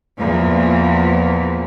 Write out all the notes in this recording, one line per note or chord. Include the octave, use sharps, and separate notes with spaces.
E2 A#2 F3